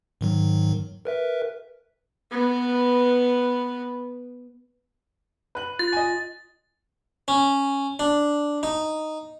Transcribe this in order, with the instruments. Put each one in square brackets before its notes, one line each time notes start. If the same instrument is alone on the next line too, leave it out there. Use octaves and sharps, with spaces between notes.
[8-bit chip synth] G#2 D#3 F#3
A#4 B4 E5
[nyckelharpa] B3 B4
[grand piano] B4 F#6 F#7
[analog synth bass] F4 [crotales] A6
[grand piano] D#5 G#5
[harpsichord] C#4
D4
D#4